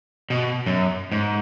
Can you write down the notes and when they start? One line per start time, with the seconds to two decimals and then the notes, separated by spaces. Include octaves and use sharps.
0.30 B2
0.66 F#2
1.12 G#2